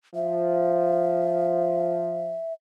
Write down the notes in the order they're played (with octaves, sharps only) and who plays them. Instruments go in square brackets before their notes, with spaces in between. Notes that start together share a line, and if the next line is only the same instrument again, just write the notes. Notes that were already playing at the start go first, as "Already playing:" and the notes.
[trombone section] F3 [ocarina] E5